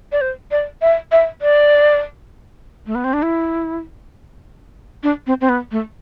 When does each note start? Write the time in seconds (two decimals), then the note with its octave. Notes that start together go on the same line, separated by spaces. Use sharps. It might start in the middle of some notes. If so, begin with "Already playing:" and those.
0.12 D5
0.21 C5
0.51 D5
0.82 E5
1.12 E5
1.42 D5
2.87 A3
2.95 B3
3.04 C4
3.13 D4
3.22 E4
5.03 D4
5.27 C4
5.41 C4
5.49 B3
5.71 A3